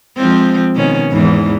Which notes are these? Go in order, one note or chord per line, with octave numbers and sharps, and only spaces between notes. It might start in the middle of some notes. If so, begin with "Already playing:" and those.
F3 G#3 C4
B2 D#3 C#4
E2 G#2 E3